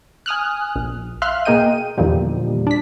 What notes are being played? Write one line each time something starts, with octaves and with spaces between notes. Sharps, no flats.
G#5 D#6 F6 F#6
A#1
E5 F5 C6 F6 F#6
B2 A#3 G#4 D#5 G5 D#7
E2 A#2 D3 D#3 F3 G3
D4 B6